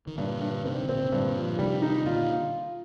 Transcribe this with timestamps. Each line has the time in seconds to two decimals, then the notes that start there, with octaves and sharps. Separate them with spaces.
0.07 D#3
0.18 G2 A#2 D3
0.41 G2
0.65 C3 D#3 C4
0.83 C3
0.88 A#2 D3 C4
1.03 C3
1.11 G2 A#2 D3
1.36 F3
1.59 C3 D#3 G3
1.82 D#4
2.05 A#2 D3 F4